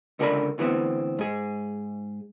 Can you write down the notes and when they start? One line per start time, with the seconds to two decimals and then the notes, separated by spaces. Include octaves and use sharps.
0.19 C#2 D3 A4 A#4 D5 B5
0.58 D2 E3 A3 B3 C4
1.19 G#2 G#4